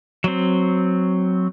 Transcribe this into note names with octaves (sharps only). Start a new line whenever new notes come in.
F#3 C4